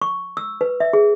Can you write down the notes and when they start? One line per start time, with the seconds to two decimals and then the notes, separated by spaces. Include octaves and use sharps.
0.02 C#6
0.37 E6
0.61 B4
0.80 E5
0.93 G#4